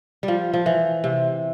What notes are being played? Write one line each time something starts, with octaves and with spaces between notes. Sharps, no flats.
G3
F3
F3
E3
C3